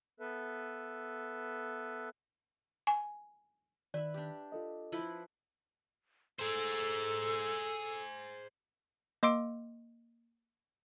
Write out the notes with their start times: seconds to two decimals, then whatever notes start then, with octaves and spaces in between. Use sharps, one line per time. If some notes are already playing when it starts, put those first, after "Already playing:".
0.20 B3 A4 B4 E5
2.87 G#5
3.94 D#3 B4 D5 E5
4.14 D4 G4
4.52 F4 A4 D#5
4.92 F3 E4 B4
6.39 G#4 A4 C5
9.23 A#3 D#5 C6 D6 E6 D7